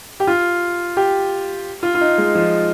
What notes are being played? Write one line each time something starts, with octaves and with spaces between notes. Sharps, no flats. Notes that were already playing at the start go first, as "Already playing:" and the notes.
G4
F4
G4
F4
F4
D#4
G#3
F3